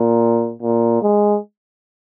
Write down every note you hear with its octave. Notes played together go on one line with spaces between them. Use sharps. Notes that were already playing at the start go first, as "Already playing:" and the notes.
Already playing: A#2
A#2
G#3